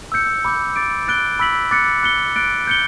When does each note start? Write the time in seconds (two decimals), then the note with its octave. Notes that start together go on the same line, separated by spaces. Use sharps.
0.12 E6 G6 C#7
0.45 B5 D6 G6
0.76 D6 A6 D7
1.08 F#6 A6 D7 G7
1.39 B5 E6 B6 F#7
1.71 D6 F#6 A6 C#7
2.03 F#6 C#7 G7
2.36 F#6 A6 D7
2.67 G6 C#7 G7